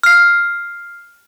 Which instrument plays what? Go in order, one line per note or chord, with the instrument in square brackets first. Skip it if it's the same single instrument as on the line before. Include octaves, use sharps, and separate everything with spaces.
[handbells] F6 C7